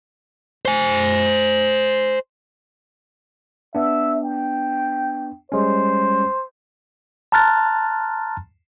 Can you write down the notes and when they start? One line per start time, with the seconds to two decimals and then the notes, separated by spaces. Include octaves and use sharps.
0.65 C5 G#5
3.75 B3 D4 E5
4.23 G5
5.52 G3 G#3 C#4 C5
7.32 A5 A#5 C6 F6 F#6 A6